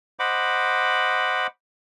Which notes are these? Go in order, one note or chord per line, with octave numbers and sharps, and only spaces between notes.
C5 D#5 F#5 B5 D6